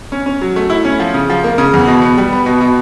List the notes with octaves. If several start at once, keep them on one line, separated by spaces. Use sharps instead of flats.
C#4
C#4
F#3
A3
E4
C#4
F3
C#3
F3
A#3
C#3
E2
B2
B3
G3
B3
B2
B2